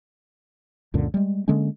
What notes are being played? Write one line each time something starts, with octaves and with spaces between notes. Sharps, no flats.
C#2 F#2 A#2 D3
G3 G#3
D3 G#3 A#3 C#4